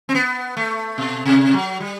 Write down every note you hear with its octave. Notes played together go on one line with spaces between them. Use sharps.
C4
B3
A3
B2
C3
F#3
G3